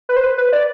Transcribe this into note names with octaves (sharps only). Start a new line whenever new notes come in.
B4
C5
B4
B4
D5